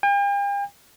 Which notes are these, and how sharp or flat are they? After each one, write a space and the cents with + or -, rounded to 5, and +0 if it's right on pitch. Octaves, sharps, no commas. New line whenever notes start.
G5 +45